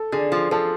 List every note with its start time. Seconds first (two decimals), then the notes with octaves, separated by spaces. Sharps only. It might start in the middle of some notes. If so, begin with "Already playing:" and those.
Already playing: A4
0.12 D3 G#4
0.32 F3
0.51 F3 A4